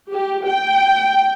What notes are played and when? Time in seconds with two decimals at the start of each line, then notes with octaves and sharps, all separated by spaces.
0.11 G4
0.46 G5